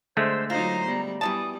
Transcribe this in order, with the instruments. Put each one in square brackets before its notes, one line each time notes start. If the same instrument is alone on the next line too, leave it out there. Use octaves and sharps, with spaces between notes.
[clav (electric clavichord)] D3 G#3 A3 [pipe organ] C5 E6
[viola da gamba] F#3 D#4 C5 [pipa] F4 [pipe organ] A#5
[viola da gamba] G3 B3
[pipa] B2 E3 A5 [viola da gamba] G3 B3 [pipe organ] D#6